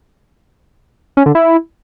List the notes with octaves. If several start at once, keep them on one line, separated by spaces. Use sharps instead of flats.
C#4
D3
E4